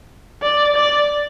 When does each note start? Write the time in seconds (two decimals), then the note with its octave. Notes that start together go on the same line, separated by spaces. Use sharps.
0.43 D5
0.76 D5